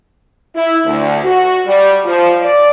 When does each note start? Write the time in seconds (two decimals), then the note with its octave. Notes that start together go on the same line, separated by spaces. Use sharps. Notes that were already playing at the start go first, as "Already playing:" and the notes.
0.54 E4
0.84 D2
1.24 F#4
1.66 G3
2.05 F3
2.41 D5